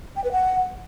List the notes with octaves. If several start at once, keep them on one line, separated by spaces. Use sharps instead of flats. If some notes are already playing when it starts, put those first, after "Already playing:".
G5
B4
F#5